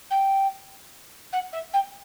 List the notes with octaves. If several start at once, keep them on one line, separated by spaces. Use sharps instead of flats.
G5
F#5
E5
G5